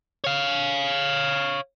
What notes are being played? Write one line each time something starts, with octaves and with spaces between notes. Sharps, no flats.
C#5 F5